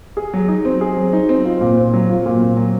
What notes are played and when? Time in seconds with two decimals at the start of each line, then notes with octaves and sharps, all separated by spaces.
0.17 G#4
0.34 F#3
0.48 D#4
0.65 C4
0.81 G#4
0.97 F#3
1.13 D#4
1.29 C4
1.45 F4
1.61 A#2
1.78 C4
1.94 F#3
2.10 F4
2.26 A#2
2.41 C4
2.57 F#3